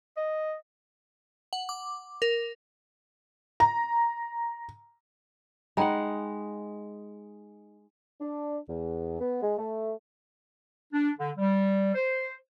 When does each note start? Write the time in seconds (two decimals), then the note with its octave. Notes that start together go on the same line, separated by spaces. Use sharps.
0.17 D#5
1.53 F#5
1.69 D6
2.22 A#4
3.60 A#5
5.77 G#3 D#4 F#5 G5 A#5 B5
8.21 D4
8.68 E2
9.20 B3
9.42 G#3
9.58 A3
10.93 D4
11.19 D3
11.38 G3
11.95 C5